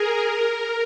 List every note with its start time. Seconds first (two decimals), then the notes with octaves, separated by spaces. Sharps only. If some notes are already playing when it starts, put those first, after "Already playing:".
Already playing: G#4 A#4
0.25 A#4